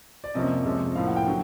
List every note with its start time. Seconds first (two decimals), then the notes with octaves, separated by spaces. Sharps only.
0.24 D5
0.34 F2 C3 F3 A#3 C#4 D#5
0.65 F2 C3 F3 G#3 C#4
0.95 A2 F3 A#3 F5
1.07 F#5
1.16 G5
1.27 D3 F#3